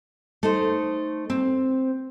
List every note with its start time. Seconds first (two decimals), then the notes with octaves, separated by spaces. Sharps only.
0.43 A3 D#4 C5
1.30 C4